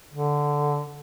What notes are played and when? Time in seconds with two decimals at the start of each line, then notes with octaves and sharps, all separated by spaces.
0.14 D3